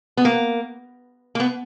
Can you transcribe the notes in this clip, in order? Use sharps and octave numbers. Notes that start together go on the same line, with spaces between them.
B3
A#3
A#3
B3